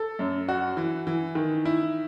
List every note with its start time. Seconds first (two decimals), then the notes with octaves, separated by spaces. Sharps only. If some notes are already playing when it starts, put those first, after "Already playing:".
Already playing: A4
0.19 F#2
0.48 F#4
0.77 E3
1.07 E3
1.35 D#3
1.65 E4